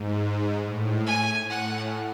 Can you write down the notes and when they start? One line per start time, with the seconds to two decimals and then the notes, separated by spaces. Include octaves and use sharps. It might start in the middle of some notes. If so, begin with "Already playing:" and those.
Already playing: G#2
0.63 A2
1.07 G#5
1.48 A2 F#5